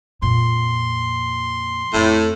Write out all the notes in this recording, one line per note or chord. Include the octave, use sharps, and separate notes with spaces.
F2 A#2 C6
F2 A2